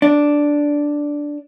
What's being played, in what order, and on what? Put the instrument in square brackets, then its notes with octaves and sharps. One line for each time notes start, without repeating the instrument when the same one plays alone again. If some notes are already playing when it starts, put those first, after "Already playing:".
[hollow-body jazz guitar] D4